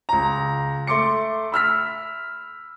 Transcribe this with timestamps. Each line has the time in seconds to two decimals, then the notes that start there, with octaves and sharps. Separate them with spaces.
0.09 C#2 A#5
0.87 A3 C6 D6 C#7
1.52 B5 E6 F6 B6